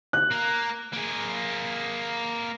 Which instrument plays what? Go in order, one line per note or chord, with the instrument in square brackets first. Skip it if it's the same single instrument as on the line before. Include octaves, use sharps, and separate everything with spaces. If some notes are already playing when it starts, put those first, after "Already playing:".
[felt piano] F#6
[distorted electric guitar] A#3 A#4
A#3 G#4